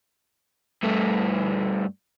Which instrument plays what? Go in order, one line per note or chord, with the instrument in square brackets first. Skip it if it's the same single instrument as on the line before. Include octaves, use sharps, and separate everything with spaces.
[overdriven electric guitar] G2 A3